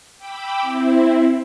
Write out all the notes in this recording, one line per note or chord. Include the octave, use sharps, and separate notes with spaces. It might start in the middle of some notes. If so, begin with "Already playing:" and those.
G5 B5 D6 E6
C4 E4